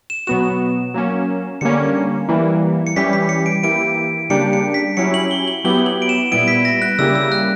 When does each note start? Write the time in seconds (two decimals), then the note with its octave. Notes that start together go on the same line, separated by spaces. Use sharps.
0.10 E7
0.27 B2 F#3 B3 F#4 E7
0.94 F#3 A#3 C#4
1.61 D3 G3 A#3 C#4 C#7
2.28 E3 G3 A#3 E4
2.87 C#7
2.96 E3 G3 C#4 G4 B6
3.13 B6
3.29 C#7
3.46 D7
3.63 E3 A#3 E4 G4 D7
4.30 C#3 G3 A#3 D4 G4 C#7
4.53 C#7
4.74 B6
4.97 F#3 C#4 E4 G4 C#7
5.14 F#7
5.31 G7
5.47 F#7
5.64 F#3 B3 E4 G4 G7
5.86 F#7
6.02 D7
6.09 E7
6.31 A#2 G3 B3 E4 D7
6.48 B6
6.65 A#6
6.82 F#6
6.99 C#3 G3 A#3 E4 G4 E6
7.15 E6
7.32 F#6